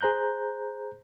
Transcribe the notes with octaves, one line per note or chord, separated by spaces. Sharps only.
G#4 C5 A#5 F#6 G6